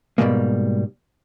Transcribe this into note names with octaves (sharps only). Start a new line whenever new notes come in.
G#2 B2 D3 G3 G#3 A#3